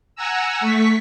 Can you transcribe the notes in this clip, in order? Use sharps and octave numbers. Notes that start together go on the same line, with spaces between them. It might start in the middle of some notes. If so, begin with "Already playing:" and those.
F#5 G#5 A#5 E6
A3 C#6 B6